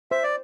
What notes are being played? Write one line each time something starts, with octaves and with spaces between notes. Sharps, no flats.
C5 E5
D5